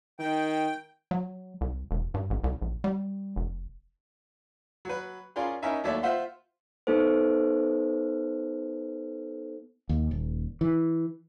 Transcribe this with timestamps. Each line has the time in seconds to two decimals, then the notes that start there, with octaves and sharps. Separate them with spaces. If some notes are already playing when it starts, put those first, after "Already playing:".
0.19 D#3 G5
1.11 F#3
1.61 C2
1.91 E1
2.14 G2
2.30 A1
2.44 C2
2.62 A#1
2.84 G3
3.36 F1
4.85 F#3 B4
5.36 C#4 F4 G#4 A#4 D5 C6
5.62 C#4 D#4 A#4 D#5 E5 G#5
5.84 D#2 F#3 A3 C#5 D5 E5
6.03 F4 C5 E5 F#5 C6
6.87 B3 D#4 A4 B4 C5
9.89 D#2
10.11 D#1
10.61 E3